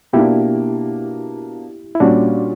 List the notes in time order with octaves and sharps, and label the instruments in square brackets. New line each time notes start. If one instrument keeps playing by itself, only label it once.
[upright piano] B2 A#3 D4 [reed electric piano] E4 G4
[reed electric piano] E4
[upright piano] A#2 G3 C#4 [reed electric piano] D4 F#4